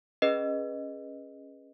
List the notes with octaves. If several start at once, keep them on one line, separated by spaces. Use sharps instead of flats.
C#4 G#4 B4 D#5